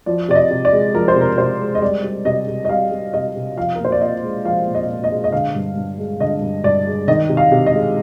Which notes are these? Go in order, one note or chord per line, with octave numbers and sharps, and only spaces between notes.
F3 D5
C3 D5
D#5
C3
D5
G#3
F3 A#4
C5
C3
A#4
C3 C5
G#3
D#5
G3 D5
G3
C3 D#5
C3
D#5
G3 F5
G3
C3 D#5
C3
F3 F5
A#4
A#2 C5
D5
A#2 D#5
G#3
F3 F5
A#2
D#5
A#2
D#5
G#3
D#5
D3 F5
G2
G2
G#3
D3 D#5
G2
G2 D5
G#3
D#3 D#5
C3
F5
C3
D#5
G#3